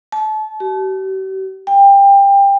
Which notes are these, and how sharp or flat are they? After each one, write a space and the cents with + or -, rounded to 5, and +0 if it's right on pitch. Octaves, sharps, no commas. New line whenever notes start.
A5 -30
G4 -45
G5 +25